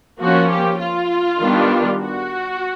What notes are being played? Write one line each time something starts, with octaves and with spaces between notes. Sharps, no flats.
F3 A#3 C#4 F#4
G4
F4
D#3 G3 B3 D4
F#4